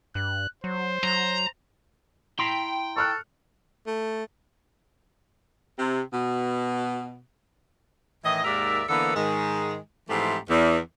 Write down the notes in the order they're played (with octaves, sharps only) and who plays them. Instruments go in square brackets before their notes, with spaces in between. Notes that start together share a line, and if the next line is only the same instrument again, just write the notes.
[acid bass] G2 [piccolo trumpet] F#6
[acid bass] F#3 [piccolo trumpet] C5
[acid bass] F#3 [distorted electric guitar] A#5
[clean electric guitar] E4 A#5 C6 [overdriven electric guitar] G5
[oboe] A4 [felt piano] C#6 F6 F#6
[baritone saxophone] A3
[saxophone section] C3
B2
A2 D#3 E3 D#5
D#2 G#2 A#4 D5 E5
D3 E3 A#3 B3 A4
G#2 D#3 G#3
G#2 E3 F3 A3 C4 G4
E2